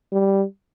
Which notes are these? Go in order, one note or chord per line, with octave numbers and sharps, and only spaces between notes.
G3